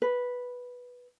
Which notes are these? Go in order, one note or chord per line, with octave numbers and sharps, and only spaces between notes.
B4